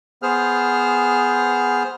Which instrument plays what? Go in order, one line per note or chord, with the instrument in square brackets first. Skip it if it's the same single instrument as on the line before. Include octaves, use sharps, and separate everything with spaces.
[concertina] B3 G#4 C5 F6